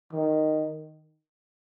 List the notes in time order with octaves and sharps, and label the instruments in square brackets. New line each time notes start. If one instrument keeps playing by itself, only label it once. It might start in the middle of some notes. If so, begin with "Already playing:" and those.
[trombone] D#3